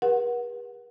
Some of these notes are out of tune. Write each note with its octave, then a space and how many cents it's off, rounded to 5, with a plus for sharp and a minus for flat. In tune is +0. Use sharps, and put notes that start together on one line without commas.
G4 +45 B4 -45 F#5 +0